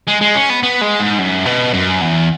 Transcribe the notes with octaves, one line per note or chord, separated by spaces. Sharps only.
G#3
G#3
C#4
B3
B3
G#3
G#2
F#2
B2
F#2
E2